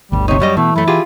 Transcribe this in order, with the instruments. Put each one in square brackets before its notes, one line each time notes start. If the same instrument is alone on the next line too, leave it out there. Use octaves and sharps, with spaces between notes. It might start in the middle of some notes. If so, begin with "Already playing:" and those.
[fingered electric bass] G1 D2 [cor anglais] G3
[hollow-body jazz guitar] C3 D#4 [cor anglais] C#5
[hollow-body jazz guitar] F#2 G3 D#5
[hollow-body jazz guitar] B2 [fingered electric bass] E3 [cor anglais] A3
[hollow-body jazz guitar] F#2 A3 [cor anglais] E4
[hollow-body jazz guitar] F4 G4 G#4